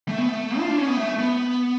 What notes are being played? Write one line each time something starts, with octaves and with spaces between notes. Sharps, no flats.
A3
B3
A3
F4
D4
C#4
B3
A3
B3